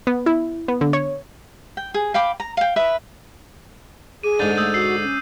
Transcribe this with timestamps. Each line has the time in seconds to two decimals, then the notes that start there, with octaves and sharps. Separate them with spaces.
0.07 B3
0.26 E4
0.68 B3
0.81 D3
0.93 C#5
1.77 G5
1.94 G#4
2.14 F5 G5 B5 D6
2.40 A#5
2.57 F5 G5
2.76 B4 E5 D#6
4.23 G#4 D6 D#7
4.39 G#2 D3 G6 A6 D#7
4.57 A3 D#6 E6 G6
4.74 F#4 E6 C7
5.04 C#4